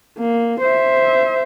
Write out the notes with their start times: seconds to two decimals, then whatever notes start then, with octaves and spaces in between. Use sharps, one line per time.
0.18 A#3
0.61 C5 E5